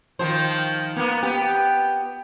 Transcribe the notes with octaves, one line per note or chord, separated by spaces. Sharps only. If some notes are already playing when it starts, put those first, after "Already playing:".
D#3 F3 C5
A#3 B3
B3 G4